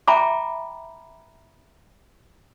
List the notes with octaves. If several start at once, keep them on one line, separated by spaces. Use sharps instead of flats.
E5 G5 G#5 A#5 B5 D6